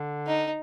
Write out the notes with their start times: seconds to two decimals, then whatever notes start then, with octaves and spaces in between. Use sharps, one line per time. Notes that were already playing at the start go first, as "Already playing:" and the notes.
Already playing: D3
0.27 D#4